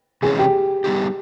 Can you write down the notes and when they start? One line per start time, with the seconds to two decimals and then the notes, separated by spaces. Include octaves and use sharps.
0.22 C3 E3 G#3 C#4 G#4
0.39 G4
0.84 G3 B3 D#4 G4